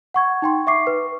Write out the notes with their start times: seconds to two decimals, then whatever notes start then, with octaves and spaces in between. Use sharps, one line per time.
0.14 F#5 C#6 G#6
0.42 D#4 G5 C6
0.67 E5 C#6 D6 C7
0.87 B4